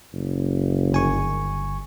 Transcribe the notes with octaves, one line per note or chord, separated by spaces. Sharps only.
F#1
G1 G#5 C#6